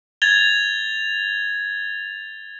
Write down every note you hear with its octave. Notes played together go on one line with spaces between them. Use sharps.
G#6 A6 F7 G7